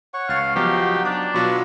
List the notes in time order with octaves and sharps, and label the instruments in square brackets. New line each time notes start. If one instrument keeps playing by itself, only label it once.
[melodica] C#5 F#5 C#6
[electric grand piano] C#2 A6 [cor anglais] F5
[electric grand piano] F3 F#3 B3 [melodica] D#4 F#4 [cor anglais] G4
[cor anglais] D4 [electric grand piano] D6
[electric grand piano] B2 F#3 F4 [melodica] B4 B5 C#6